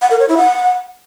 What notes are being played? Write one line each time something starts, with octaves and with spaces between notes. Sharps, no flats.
F#5
A#4
C#5
E4
F#5